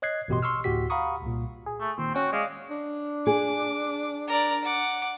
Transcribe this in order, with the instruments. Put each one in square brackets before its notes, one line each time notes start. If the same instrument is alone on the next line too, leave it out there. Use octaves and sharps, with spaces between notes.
[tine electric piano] C#5 D#5 F#6 G#6 C7
A1 G2 B2 G4 D#5 C6
C6 C#6 E6 F6
D2 A2 F#4 G4 B6
F5 F#5 A#5 B5 C#6 D#6
C2 A#2
[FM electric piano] G#4
[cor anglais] A3
[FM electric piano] D#2 A#2 [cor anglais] C4
[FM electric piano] C#4 G5 [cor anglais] F#4
[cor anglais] G#3 [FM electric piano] D5 F5 D6
[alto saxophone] D4
[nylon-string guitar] G#4 [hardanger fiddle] D6
[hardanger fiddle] A#4 D5
F#5 D6